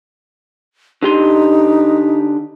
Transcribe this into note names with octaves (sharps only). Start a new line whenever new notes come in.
D3 D#4 G4 C6